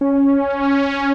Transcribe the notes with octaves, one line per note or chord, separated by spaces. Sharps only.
C#4